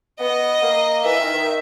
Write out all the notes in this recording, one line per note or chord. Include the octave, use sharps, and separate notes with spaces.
B3 D#5
A#3
E3 E5
D#3
D#3